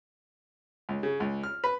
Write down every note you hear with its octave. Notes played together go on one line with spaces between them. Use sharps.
C#2
C#3
C#2
F6
B4